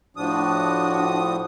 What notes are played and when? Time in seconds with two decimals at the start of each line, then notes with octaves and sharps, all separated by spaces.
0.17 A2 F3 D4 F#4 D#6